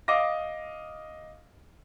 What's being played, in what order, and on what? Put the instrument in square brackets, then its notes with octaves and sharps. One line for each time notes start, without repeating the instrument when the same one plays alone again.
[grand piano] D#5 F5 D6 A#6